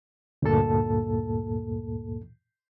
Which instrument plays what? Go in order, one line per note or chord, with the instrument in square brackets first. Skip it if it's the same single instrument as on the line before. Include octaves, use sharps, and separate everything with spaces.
[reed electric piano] D2 G2 A#2 A#3 A4 A5